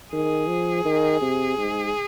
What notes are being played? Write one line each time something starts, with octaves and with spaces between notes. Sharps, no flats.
D#3 G#4
F3
D#3
C3
G#2